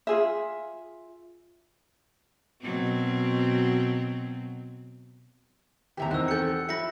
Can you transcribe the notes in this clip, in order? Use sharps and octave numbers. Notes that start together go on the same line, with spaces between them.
F4 G#4 E5
B2 F#3 C4
D#2 C3 E3 G4 E5 A#5
E2 D#3 C4 D#5 E6 F#6
G4 A4 G6 C#7
F3 E5 B5 A#6 C#7